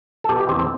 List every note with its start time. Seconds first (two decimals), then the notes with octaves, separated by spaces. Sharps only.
0.24 A4
0.29 B2 G4
0.40 G4
0.49 E2 C4
0.59 C4